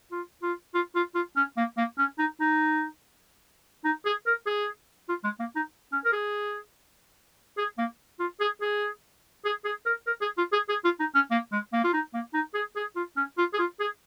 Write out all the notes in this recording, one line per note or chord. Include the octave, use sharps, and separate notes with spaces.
F4
F4
F4
F4
F4
C#4
A#3
A#3
C#4
D#4
D#4
D#4
G#4
A#4
G#4
F4
G#3
A#3
D#4
C#4
A#4
G#4
G#4
A#3
F4
G#4
G#4
G#4
G#4
A#4
A#4
G#4
F4
G#4
G#4
F4
D#4
C#4
A#3
G#3
A#3
F4
D#4
A#3
D#4
G#4
G#4
F4
C#4
F4
G#4
F4
G#4